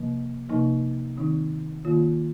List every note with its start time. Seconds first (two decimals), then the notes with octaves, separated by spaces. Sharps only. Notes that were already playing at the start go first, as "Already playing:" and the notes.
Already playing: C3 F3 A#3
0.49 C3 F3 A#3 D#4
1.18 D#3 C4 D#4
1.85 D#3 A#3 F4